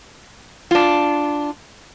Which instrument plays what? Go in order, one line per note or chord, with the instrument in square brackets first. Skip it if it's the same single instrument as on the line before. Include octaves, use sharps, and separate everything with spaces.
[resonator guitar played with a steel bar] D4 F4